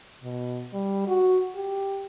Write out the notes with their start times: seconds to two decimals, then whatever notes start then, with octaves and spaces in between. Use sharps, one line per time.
0.23 B2
0.73 G3
1.08 F#4
1.55 G4